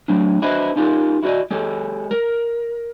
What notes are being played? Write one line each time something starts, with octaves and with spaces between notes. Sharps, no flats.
F#3 A3 C#4 D4
D4 E4 F#4 B4 C5 D#5
C#4 D#4 F4 G4 A#4
E4 F#4 A#4 D5 D#5
G#3 G4 A4 C#5
A#4